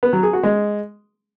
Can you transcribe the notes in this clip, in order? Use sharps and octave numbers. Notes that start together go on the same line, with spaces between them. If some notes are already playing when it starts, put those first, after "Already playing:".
B3
F#3
G#4
F#4
G#3